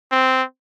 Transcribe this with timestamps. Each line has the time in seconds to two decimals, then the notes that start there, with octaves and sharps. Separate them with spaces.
0.12 C4